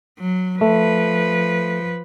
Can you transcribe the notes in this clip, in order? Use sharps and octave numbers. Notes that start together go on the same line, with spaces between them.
F#3
F3 A3 B4